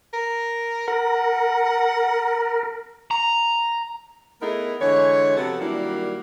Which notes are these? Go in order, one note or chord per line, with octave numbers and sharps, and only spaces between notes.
A#4
A#4 F#5
A#5
A3 B3 D#4 E4 G#4 A#4
D3 E3 G#3 C#5
C3 F3 B3 F#4 A4
D#3 F#3 G3 A#3 D4 E4